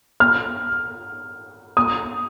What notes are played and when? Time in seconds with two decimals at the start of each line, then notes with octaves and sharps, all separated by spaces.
0.20 F6
1.77 D#6